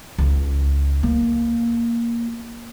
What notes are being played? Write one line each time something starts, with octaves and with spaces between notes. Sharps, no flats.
C#2
A#3